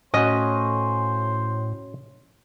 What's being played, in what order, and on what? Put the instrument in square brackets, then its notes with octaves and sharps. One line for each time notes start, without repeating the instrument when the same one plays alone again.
[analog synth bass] A2 [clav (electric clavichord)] C#4 F#4 [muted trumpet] C5 [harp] D#5